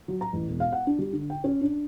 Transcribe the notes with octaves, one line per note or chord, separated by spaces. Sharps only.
F#3
A#5
A1
E1
F5
F#5
D4
G3
D3
G5
C#4
D4